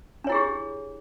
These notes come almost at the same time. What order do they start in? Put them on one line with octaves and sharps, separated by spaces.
D4 C#5 E4 G#4 G4